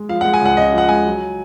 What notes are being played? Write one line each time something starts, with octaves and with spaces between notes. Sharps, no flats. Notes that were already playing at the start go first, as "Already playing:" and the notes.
Already playing: G#3
F3 F5
F#5
G#3
G#5
C#2 F#5
C#3 D#5
F3 F#5
G#3 G#5
F#3